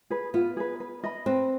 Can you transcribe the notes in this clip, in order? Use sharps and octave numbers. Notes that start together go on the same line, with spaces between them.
G#4 B4
B3 F4
G#4 B4
B4
D#5 B5
C4 B4